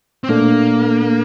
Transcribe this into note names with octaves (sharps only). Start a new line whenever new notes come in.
C4
A#2 A3 A#3 D4 A4